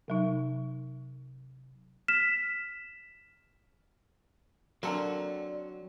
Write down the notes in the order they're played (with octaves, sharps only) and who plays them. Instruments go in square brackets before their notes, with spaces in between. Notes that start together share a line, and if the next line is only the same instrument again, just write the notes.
[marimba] C3 F#3 D#4
[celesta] F6 B6 E7
[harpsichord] D3 C4 [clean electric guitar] F#3 [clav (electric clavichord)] A#3 A4 A#4 [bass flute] D5